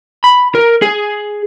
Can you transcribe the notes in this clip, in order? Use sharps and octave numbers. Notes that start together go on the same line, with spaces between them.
B5
A#4
G#4